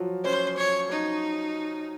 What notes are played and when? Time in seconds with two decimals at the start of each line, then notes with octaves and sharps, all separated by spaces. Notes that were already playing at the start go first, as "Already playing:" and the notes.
Already playing: F3 F#3
0.24 C#4 C5
0.57 C#5
0.91 D#4